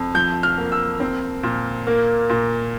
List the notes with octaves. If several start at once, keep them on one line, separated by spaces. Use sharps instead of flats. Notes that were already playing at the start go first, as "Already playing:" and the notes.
Already playing: F2
F3 G6
F6
A#3
E6
C4
A#2
A#3
A#2